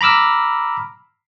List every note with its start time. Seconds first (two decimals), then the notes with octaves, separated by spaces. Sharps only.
0.01 A#5 B5 D6 E6 F6